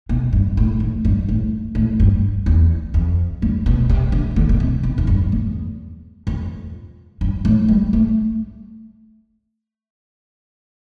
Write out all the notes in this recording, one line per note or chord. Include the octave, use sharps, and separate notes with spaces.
B2
G2
A2
A2
G2
A2
A2
G2
E2
F2
G2
B2
C3
D3
D3
B2
C3
B2
F2
G2
E2
F2
G2
A2
G3
A3